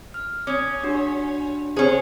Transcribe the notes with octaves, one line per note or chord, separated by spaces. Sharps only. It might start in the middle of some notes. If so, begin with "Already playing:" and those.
F6
C#4 D6 D#6 G#6
D4 F#4 G4
C#4 G#4 C5 C#6